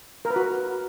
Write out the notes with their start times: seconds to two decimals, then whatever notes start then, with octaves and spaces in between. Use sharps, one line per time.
0.25 A#4
0.30 B4
0.36 F#4